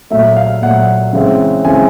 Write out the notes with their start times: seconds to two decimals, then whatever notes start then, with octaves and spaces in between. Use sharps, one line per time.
0.10 A#2 F#3 A3 E5
0.37 F5
0.62 A#2 F#3 A3 F#5
1.13 C#3 E3 G#3 C4
1.65 C#3 E3 G#3 C4 G#5